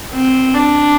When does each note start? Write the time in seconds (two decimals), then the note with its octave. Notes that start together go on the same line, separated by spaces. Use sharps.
0.13 C4
0.55 D4